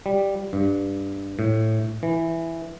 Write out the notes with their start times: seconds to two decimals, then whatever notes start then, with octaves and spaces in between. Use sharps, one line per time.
0.06 G3
0.53 G2
1.39 A2
2.03 E3